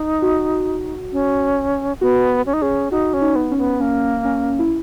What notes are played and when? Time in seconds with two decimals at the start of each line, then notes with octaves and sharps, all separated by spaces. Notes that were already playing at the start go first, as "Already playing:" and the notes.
Already playing: D#4
0.22 F#4
1.12 C#4
2.01 B3 F#4
2.46 C#4
2.53 D#4
2.62 C#4 G#4
2.92 D#4 F#4
3.13 C#4
3.21 D#4
3.36 B3
3.51 C#4
3.58 B3
3.80 A#3 C#4
4.25 C#4
4.59 E4